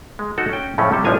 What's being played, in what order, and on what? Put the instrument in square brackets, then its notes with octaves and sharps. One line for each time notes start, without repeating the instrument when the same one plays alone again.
[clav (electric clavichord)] G#3
D#4 F#4 A4
C#4 G5
F2 A2 C#3 A3 C#4
C3 G3 E4 A4
A1 F3 D4 G#5 A#5